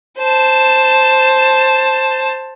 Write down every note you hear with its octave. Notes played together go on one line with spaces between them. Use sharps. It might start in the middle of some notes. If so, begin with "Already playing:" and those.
C5 A5